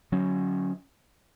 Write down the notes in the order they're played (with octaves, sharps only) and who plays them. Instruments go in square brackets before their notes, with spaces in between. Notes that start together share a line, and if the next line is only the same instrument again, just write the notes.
[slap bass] D3 F#3 C#4